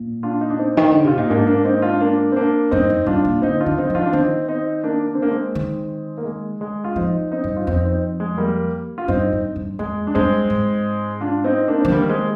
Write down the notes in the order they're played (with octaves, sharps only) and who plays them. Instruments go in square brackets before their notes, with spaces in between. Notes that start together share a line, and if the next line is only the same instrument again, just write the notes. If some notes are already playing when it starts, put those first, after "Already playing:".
Already playing: [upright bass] A#2
[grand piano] D4 F4
D#4
D4
C4 D#4
[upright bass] D#3
D3
[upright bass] C3 [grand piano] F4
[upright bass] A#2 [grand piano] D#4
[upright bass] G#2 [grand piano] A#3 D4
[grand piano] A#3 D4
C4 D#4
D4 F4
A#3 D4
C4
A#3 D4
[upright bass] G2 [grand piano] C4 D#4
[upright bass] F2
[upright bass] G2 [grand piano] D4 F4
[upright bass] A#2
[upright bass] D3 [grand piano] C4 D#4
[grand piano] D4 F4
[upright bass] D#3
[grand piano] C4 D#4
[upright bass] F3
[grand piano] D4 F4
D4
[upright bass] D#3 [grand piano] C4 D#4
[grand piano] C4 D#4
A#3 D4
D4
C4
A#3 D4
G#3 C4
[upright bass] D#3
[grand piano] A#3
G#3
G#3
F4
[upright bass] F3 [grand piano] C4 D#4
[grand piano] C4 D#4
[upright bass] G2
[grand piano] F4
[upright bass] F2 [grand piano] C4 D#4
[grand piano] C4 D#4
G#3
G3 A#3
F4
[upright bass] G2 [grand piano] C4 D#4
[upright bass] G2
G2
[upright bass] F2 [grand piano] G#3
[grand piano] D4
[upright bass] G2 [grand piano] G#3 C4
[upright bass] G#2
[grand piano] D4 F4
C4 D#4
A#3 D4
[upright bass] F3 [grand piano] C4
[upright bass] D#3 [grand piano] G3 A#3
[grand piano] G#3 C4